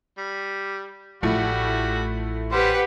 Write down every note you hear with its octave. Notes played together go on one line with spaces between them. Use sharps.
G3
A1 F3 G3 A3 E4 F#4
G3 G4 B4 C5 F#5